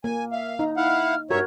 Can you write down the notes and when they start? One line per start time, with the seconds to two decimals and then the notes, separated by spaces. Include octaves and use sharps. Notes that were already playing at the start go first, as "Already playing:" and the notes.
0.04 A#3 G#5
0.32 E5 F5
0.59 D#4 A#5
0.77 E4 F5 F#5 F6
1.31 G2 F#4 A#4 C#5 E5 G#6